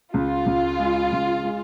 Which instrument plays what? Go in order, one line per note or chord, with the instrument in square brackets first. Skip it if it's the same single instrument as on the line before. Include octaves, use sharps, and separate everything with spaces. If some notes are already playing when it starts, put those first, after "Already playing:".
[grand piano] C#2 [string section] F4
[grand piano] C#2
G#3
C#2
G#3